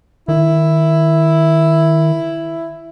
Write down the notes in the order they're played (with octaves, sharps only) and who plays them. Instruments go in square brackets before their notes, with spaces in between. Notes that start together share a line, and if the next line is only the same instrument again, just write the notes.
[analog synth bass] D#3 [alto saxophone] E4